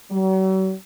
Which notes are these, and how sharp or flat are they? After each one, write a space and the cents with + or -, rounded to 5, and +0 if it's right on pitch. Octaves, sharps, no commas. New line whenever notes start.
F#3 +45